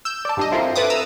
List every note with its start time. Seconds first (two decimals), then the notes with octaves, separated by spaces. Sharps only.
0.05 E6 G6
0.25 D5 A5
0.37 G2 D4 D#5
0.52 C4 E4 F4 A4 A#4 C5
0.76 A4 B4 E5 D6 D#6
0.90 A#5 D#6 E6